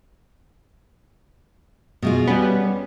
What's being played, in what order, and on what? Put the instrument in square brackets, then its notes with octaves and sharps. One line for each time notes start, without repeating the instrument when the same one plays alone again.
[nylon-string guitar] B2 G#3 F4
[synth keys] G3 B3 [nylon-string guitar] C#4